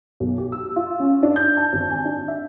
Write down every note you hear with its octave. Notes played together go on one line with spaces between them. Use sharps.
B1
G4
E6
F4
C#4
D4
G6
A5
G#1
G#5
D4
E5